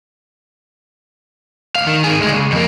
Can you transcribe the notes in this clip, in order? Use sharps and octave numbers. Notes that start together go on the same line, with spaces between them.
D2 F5
D#3
D#3 G#4
D2 G#3
C#2
F2 A#3